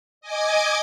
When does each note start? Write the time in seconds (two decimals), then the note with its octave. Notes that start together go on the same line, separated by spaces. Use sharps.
0.21 D#5 G#5 D6 G#6